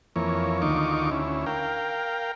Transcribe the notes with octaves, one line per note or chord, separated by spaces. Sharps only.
F2 E3 A#3 C#5
D2 D#3 D#4 F4 C#6 D6
D2 C#4 E4
A#4 F5 G5